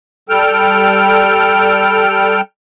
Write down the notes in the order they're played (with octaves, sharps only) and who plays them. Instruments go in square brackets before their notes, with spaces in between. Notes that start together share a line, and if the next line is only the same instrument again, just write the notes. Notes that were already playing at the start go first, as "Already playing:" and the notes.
[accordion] G3 A4 G5 F6